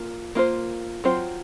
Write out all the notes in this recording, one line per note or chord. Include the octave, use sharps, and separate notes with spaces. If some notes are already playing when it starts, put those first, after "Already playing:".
Already playing: A#3 F4
A#3 F4 C5
F#3 C4 F4 C5